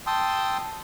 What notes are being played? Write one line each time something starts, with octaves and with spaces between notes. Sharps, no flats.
G5 A5 C6 D#6 E6